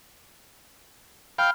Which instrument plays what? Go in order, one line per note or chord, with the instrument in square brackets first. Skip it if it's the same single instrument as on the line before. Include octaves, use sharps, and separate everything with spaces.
[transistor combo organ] F5 G5 [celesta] B5 F6